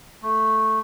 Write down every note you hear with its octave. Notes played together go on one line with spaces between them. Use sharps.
A3